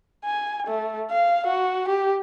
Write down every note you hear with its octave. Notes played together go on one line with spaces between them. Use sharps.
G#5
A3
F5
F#4
G4